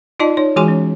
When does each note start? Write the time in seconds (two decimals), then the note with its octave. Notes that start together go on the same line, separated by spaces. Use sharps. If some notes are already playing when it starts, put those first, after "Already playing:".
0.20 D#4 F4 D5 D#5 A5
0.37 D#4 C#5
0.56 E3 G#3 F#4 G#4 G#5 C6
0.68 C#4